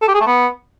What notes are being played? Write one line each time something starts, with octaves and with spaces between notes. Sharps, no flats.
A4
G4
G#4
A3
B3